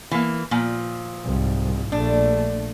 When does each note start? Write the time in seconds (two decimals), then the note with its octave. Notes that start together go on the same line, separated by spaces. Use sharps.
0.11 E3 A#3
0.51 A#2 F3
1.25 C2 G#2
1.92 A#1 A3 D4